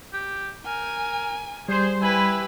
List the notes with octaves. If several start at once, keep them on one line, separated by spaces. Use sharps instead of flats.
G4
A#4 G#5
G3 G#4 C5
E4 G4 B4 G#5 B5